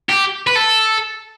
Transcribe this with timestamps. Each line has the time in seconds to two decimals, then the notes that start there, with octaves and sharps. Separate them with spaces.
0.09 G4
0.47 B4
0.55 A4